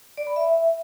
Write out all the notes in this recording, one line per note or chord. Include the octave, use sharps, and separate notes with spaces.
D5
B5
E5